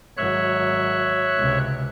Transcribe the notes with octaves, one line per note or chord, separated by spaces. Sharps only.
G#1 F#3 C#5 E5 F#6
C#2 C3